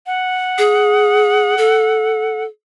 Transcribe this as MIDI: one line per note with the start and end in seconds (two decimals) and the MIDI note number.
0.07 2.43 78
0.58 1.55 68
1.58 2.45 69